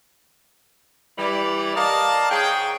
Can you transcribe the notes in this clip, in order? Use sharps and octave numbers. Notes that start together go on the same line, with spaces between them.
E3 G3 D5
A#4 D5 D#5 F5 A5 A#5
G#2 G#4 C#5 G5